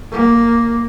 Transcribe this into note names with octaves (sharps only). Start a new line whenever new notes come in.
A#3